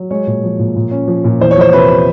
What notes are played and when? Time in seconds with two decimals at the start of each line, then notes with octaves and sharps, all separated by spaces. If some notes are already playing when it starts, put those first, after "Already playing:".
Already playing: F#3
0.11 G#3 C#5
0.27 A#2
0.44 F3
0.59 A#2
0.76 A#2
0.91 C#4
1.08 F3
1.24 A#2
1.40 E2 C5
1.51 C#5
1.57 F3 C5
1.73 C3 B4